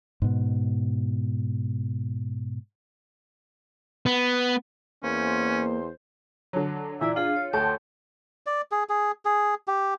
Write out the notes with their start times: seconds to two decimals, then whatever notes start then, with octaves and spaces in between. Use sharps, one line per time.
0.22 G#2 B2
4.06 B3
5.03 E2 A#3 C#4 C5
6.53 D3 F#3 A5
7.01 A#2 E3 D5 E5 A#5 D6
7.16 D4 F4 G#4 F5
7.36 C#5
7.53 D2 A3 C#5 G5 A5 C6
8.46 D5
8.71 G#4
8.89 G#4
9.25 G#4
9.67 G4